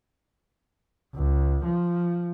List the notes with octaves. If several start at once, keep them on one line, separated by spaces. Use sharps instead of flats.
C#2
F3